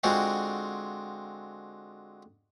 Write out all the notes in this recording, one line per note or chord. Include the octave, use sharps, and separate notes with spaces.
D3 G#3 C4 F4 F#4